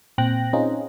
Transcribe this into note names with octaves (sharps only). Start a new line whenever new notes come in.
A#2 C4 G5 F#6 A#6
C4 C#4 D#4 F4 G#4